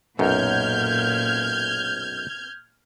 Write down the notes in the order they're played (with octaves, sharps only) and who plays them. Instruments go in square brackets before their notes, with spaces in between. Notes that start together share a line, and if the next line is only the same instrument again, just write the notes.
[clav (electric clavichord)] B1 F#2 [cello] A#2 [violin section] F6 G6 G#6